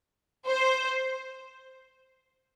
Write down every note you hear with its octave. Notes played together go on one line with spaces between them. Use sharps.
C5